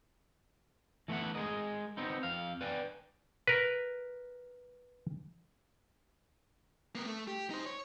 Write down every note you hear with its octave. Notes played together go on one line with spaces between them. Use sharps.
E3 A3 B3 E5 F#5
G#3 G#4 A#4 D#5
B3 C4 D#4
F2 F5
B4 D5 G5 G#5
A#4 B4
A#3 B3
A3
G4
D#4 C5
C#5